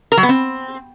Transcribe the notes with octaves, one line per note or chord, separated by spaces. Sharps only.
A#4
F#3
B3
C4